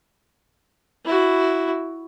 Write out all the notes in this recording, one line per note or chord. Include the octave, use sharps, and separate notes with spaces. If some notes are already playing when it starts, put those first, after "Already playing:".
E4 F#4